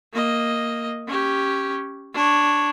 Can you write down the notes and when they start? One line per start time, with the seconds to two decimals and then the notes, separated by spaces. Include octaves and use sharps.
0.14 A#3 D#5
1.08 C#4 G4
2.13 D4 C#5